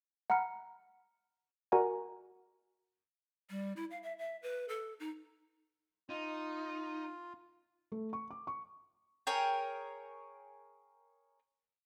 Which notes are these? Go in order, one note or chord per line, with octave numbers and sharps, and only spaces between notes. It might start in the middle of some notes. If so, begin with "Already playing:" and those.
F#5 A#5 B5 F6 C#7
F#4 A#4 D5 F#5 G#5 A#5
G3
E4
F5
E5
E5
B4
A4
D#4
D#4 F4
A3
C#6
D6
C#6
G#4 A#4 C#5 G5